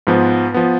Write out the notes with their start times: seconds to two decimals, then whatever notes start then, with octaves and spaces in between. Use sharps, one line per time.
0.07 G#2 F3 B3
0.54 F3 B3